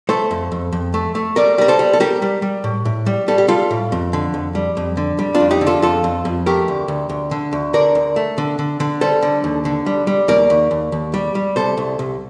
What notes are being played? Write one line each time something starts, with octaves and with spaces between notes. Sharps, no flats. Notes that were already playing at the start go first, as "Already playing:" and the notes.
A3 A4 C5
F2
F2
F2
A3
A3
G3 A#4 D5
G3 A#4
A4 C5
G3
A4
G3 G4 A#4
G3
G3
A2
A2
G3
G3 A4
G4
G3 F4 A4
A2
F2
D3
F2
G3
F2
D3
G3
D4 F4
F2
D#4 G4
D3
F4 A4
F2 F4 A4
F2
F2
A3 G4 A#4
D2
D2
D2
D3
D2
D3 A#4 D5
D2
A3
D3
D3
D3
G3 A4 C5
D3
D#2
D3
G3
G3
D#2 A#4 D5
D#2
D#2
D#2
G3
G3
C2 A4 C5
C2
C2